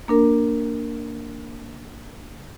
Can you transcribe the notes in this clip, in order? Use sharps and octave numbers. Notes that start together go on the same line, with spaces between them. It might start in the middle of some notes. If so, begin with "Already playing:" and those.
A#3 D4 A#4